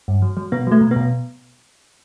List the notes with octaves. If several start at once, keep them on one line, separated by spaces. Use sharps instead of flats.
G2
F#3
F#3
B2 B3
F#3 A3
B2
B3
B2